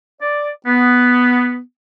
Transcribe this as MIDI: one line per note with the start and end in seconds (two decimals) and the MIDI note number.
0.22 0.51 74
0.67 1.61 59